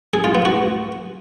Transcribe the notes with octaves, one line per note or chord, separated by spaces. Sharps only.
G#4
F4
B3
F#4